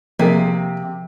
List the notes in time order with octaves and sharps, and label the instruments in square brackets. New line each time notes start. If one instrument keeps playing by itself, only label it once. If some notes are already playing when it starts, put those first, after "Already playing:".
[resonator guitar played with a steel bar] C3 [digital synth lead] F3 [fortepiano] A#3 G#4